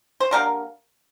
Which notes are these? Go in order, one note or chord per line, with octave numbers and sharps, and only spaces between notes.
C5
D3 G3 A#3 A#4 D5